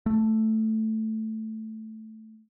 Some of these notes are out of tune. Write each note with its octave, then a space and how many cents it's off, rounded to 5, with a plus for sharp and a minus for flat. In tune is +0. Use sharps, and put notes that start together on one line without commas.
A3 +0